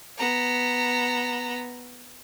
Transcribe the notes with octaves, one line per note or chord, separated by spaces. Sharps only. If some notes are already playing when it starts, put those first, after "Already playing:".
B3 A#5